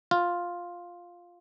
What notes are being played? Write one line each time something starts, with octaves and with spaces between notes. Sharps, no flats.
F4